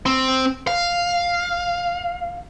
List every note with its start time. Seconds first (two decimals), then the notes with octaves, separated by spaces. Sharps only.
0.06 C4
0.67 F5